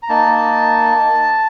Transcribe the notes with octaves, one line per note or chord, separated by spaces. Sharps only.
A#5
A#3 D#4 A5